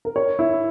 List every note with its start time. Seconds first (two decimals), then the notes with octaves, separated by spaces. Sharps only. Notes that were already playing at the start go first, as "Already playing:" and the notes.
0.05 A#4
0.16 C#5
0.39 E4